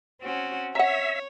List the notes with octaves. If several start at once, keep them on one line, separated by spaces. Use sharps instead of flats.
C4 C#4 F#4
C#5 E5 F#5 A#5